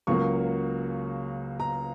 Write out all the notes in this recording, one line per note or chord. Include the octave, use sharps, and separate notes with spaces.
C#2 C#3 F#3 A#3 C#6
A#5